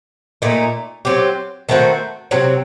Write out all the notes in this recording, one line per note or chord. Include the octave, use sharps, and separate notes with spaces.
A#2 A3 D#4
F#3 C4 G4
D#3 A3 C4 F#4
C3 F#3 C4